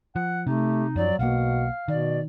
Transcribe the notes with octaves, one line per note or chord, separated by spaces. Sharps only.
F3 F#5
C3 A3 D#4 G4
F#2 F3 F#3 D5
B1 B2 A#3 F5 F#5
B2 D#3 D5